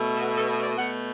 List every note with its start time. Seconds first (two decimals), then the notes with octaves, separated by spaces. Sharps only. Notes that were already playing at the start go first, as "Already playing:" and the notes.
Already playing: B2 A3
0.16 A4
0.20 F#4
0.34 A4
0.49 B4
0.63 D5
0.78 B2 A3 F#5